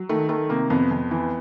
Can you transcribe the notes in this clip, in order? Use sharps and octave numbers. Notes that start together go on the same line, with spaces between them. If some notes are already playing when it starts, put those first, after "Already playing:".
Already playing: F#3
D#3 A3
D#3 A3
C3 A#3
F2 B3
F2
E3